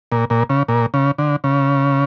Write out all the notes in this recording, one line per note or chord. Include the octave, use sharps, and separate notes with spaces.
A#2
A#2
C#3
A#2
C#3
D3
C#3